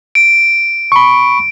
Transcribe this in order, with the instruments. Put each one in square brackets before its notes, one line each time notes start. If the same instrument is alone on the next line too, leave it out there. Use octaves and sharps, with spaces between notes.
[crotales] D7
[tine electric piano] B5 C#6